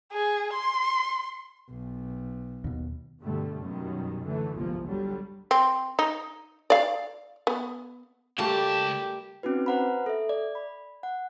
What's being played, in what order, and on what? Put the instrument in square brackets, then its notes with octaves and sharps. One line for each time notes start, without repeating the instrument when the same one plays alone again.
[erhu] G#4
C6
[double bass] B1
[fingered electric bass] D#2 B2
[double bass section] G2 B2 D3 G3 A3
F#2 B2 D#3 G3
D3 E3 A3
G1 C2 F3 G#3 A#3
D3 F#3 G3
[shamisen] C4
D#4
D5 F5
B3
[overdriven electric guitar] C#2 A5 [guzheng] G3 A3 A#3 [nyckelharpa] G4
[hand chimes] C4 C#4 D#4 F#4 B4
B4 C5 F#5 A#5 B5
A4 E5
D5
B5
F#5